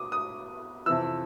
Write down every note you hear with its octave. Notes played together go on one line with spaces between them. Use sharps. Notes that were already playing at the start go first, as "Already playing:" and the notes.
Already playing: B2 D6 D#6
D#6
F2 C3 E3 E6